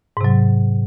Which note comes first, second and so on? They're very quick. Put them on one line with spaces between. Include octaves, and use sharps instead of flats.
G#2 C3 F#3